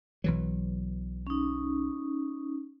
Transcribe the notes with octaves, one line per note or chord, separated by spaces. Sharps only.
B1 E3 F#3
C#4 D#4